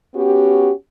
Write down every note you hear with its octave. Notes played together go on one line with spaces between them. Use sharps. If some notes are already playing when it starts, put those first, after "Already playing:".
B3 C#4 F#4 G4